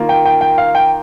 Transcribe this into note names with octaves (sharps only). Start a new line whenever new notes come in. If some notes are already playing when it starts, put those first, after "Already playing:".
Already playing: D#3 A#3 F4
G5
G5
G5
F5
G5